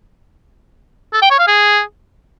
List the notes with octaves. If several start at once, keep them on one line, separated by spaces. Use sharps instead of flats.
A4
G5
C#5
F5
G#4